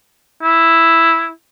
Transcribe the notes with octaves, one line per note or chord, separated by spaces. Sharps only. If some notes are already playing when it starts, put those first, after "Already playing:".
E4